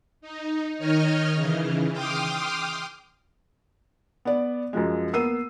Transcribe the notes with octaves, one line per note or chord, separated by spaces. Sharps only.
D#4
D#3 D#4 C#5 D#5 F6
C#3 E3
G5 C6 D6 D#6 F6
B3 D5
F#2 F3 G#3
A#3 B3 E6 C7 D#7